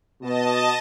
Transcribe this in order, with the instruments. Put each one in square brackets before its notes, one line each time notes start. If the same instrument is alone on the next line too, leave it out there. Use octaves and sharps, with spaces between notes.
[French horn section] B2 [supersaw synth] D#5 A5